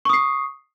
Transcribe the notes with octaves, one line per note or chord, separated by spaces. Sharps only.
C#6 D#6 C7